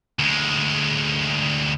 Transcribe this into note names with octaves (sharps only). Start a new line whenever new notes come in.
D2 G#3